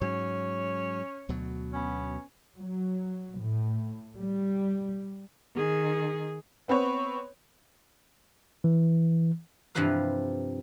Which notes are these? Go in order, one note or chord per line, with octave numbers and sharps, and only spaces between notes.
G#2 F#3 C#4 C#5
D2 B2 F#3
B3 C#4
F#3
A2
G3
D#3 G#4
B3 C4 B4 C#5
E3
G2 C3 E3 F3 B4 F5